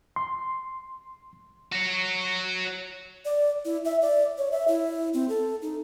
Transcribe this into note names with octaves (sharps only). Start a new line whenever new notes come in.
C6
F#4 C#5
D5
E4
E5
D5
C#5
E5
E4
C4
A4
D#4